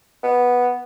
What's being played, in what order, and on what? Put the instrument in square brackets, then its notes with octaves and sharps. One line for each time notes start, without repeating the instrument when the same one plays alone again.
[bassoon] B3